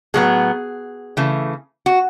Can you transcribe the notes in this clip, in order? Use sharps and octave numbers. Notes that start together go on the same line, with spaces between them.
A2 F#3 B3 G#4
C#3 E3 A3
F#4